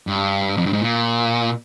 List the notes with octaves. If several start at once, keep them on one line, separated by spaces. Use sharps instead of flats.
G2
F2
G2
G#2
A#2